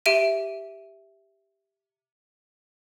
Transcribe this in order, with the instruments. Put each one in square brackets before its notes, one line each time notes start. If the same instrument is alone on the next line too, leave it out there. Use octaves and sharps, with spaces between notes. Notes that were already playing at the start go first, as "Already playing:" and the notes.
[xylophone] G4 E5 D7 D#7